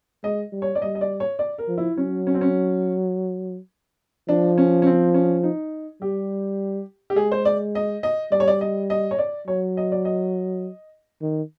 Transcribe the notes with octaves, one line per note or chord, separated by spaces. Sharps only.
G#3 D#5
G3
C#5
D5
G3 D#5
D#5
D5
C#5
D5
A#4
F3
E4
F#3 C#4
C#4
C4
C#4
F3 D4
C#4
C#4
C4
C#4
D#4
G3 G4
G4
G#3 G#4
C5
D5
D#5
D#5
G3 D5
C#5
D5
D#5
D#5
C#5
D5
F#3 C#5
D#5
D5
D#5
D#3